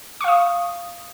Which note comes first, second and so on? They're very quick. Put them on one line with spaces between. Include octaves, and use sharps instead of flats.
C#6 F5 D#6